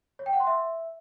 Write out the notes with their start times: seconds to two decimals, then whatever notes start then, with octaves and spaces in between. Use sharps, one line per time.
0.19 C#5
0.26 G5
0.33 F#5
0.40 C6
0.47 E5